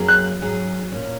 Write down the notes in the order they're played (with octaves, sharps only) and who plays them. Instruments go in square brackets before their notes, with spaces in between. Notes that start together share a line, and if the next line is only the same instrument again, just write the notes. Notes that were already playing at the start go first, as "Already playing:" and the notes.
Already playing: [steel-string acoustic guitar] F#2 F#3 A#3 C#4 G#4
[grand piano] F#6
[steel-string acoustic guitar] G#2 F#3 C#4 G#4
A#2 A#3 C#4